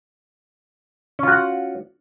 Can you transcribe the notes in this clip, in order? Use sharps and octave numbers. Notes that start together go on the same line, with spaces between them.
C#4 F4 F#4 F#5